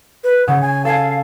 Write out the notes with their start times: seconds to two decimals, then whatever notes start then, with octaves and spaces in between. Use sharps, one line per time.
0.24 B4
0.48 C#3 F#5
0.61 G#5
0.85 A4 F5 G#5